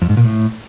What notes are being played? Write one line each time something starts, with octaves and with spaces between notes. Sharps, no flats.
F2
G#2
A#2
A2